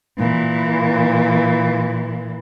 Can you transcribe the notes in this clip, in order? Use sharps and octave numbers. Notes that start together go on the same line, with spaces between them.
A#2 E3